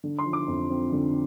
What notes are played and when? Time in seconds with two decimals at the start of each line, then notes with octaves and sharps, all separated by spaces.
0.04 D3
0.19 C6
0.26 F3
0.33 D6
0.48 F2
0.70 C4
0.92 D3